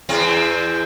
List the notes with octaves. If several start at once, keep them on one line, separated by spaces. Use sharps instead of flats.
E2 C4